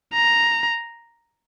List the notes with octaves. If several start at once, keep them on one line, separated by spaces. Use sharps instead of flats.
A#5